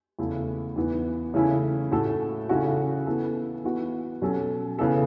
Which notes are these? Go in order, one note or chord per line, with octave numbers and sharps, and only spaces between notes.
E2 C#3 A3 E4
E2 E3 B3
C#3 E3 A3 C#4 E4
A2 A3 F#4 A4
C#3 E3 C#4 F#4 A4
E3 B3 E4 A4
E3 B3 F#4
B2 F#3 C#4 A4
C#3 E3 B3 A4